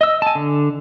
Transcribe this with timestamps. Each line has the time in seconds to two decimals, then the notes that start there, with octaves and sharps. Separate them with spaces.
0.01 D#5 E6
0.22 G#5 A5
0.35 D3